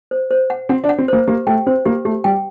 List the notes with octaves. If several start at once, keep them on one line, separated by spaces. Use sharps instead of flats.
C5
C5
F#5
C4 F#5
D4
F#5
C4
A#3 C5
A#3 G4
A3 G5
C4 C5
A#3 G4
A3 G4
G3 G5